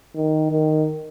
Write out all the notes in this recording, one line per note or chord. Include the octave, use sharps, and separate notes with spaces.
D#3
D#3